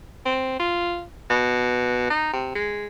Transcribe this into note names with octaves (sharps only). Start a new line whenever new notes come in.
C4
F4
B2
D#4
C3
G#3